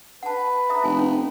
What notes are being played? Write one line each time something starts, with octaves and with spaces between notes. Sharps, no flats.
B4 F#5 A5
E5 A#5 D#6
F1 G#5 A5
C#4 F4